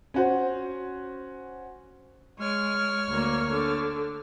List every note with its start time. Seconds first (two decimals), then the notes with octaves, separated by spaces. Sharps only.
0.14 C#4 F#4 C5
2.39 G#3 C#5 F6
3.10 D2 A#3
3.51 D3